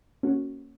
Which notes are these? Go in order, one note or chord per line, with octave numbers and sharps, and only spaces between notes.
A#3 C#4 F#4